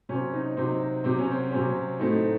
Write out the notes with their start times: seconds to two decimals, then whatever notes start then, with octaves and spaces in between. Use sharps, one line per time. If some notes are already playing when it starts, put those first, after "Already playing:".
0.09 C3 F#3 C4 C#4
0.34 D#4
0.57 C3 F#3 C4 D#4
1.04 C3 F#3 C4
1.19 C#4
1.31 C4
1.52 C3 F#3 C4 C#4
1.99 A2 F#3 A3 C4 D#4